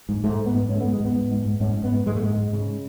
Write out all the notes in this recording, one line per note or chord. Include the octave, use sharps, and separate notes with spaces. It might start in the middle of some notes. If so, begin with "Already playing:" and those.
G#2
G#2 A3
G#2
B3
G#2
G#2 C#4
A3
B3
G#2
G#3
G#2 B3
G#2
G#2
G#2
G#2 C#4
G#2
B3
G#2
G#2 G#3
A3
G#2 G#3
G#2
C#3